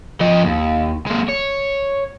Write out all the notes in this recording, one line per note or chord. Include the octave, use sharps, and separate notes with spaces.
F3 D#5
D#2
G#3 A#3
C#5